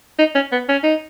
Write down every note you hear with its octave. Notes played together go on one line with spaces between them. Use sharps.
D#4
C#4
B3
C#4
D#4